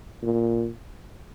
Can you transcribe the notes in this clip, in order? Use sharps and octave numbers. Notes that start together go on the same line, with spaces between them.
A#2